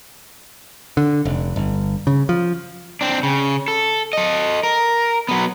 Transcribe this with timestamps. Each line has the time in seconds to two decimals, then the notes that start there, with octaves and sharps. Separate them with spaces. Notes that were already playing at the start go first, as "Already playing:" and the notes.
0.97 D3
1.25 F1
1.56 G1
2.07 C#3
2.29 F3
3.01 C4 D4
3.23 C#3
3.68 A4
4.13 A4 D#5
4.63 A#4
5.29 F#3 B3